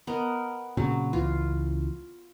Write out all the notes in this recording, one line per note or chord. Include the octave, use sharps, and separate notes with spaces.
B3 A#4 D#5
A#2 C#3 F#3 C4
C#2 E3 F4